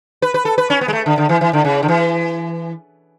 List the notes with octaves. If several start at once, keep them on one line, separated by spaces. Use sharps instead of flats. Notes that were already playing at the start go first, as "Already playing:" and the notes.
B4
B4
A4
B4
C#4
B3
G#3
A3
D3
D3
E3
E3
D3
C#3
D3
E3